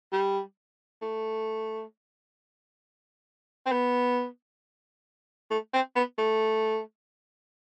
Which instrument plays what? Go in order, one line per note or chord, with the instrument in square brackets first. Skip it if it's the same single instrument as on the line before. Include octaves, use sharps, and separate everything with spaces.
[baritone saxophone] G3
A3
C4
B3
A3
C4
B3
A3